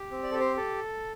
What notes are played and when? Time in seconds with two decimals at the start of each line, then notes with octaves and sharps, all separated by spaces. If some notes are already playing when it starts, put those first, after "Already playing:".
Already playing: G4
0.11 C4
0.23 D5
0.32 G4 A4
0.40 C5
0.57 A4